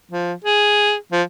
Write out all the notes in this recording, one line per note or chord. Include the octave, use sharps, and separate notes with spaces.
F3
G#4
F3